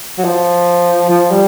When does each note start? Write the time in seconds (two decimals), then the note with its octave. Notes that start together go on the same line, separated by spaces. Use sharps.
0.18 F#3
0.24 F3
1.10 F3
1.31 G3